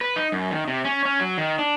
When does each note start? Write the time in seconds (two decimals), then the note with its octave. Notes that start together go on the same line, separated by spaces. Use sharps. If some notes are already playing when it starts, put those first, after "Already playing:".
0.01 B4
0.16 D#4
0.32 F#2
0.51 D#3
0.68 C3
0.85 C#4
1.05 C#4
1.20 F#3
1.38 D#3
1.58 D4